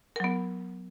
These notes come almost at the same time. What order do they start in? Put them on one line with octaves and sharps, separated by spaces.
A#4 F#3 B3